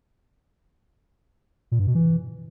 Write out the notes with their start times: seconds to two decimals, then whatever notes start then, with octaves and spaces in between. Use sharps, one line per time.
1.72 A#2
1.79 G2
1.87 B2
1.95 E3